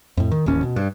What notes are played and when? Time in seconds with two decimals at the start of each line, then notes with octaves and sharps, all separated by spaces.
0.17 F2 A2
0.31 D#3
0.46 D#1 A1 D#2 C#4
0.63 B2
0.76 G2